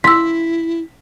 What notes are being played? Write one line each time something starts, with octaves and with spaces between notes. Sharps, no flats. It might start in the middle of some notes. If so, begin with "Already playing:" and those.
E4 C6 E6 B6